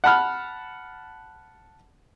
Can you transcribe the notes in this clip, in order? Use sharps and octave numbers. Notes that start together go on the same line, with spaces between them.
F#5 A5 B5 F6